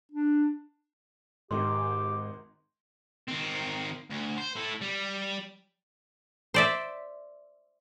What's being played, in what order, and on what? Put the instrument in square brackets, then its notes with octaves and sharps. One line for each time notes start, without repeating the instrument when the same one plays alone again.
[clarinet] D4
[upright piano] G#1 D#3 D#4 [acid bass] G#2 [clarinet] G4 [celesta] C6
[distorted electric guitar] D#3 C4
D2
C5
A3 E4
G3
[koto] C5 D5 E5